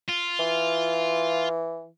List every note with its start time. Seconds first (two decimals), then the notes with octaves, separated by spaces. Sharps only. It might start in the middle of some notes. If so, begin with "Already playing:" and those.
0.09 F4
0.39 E3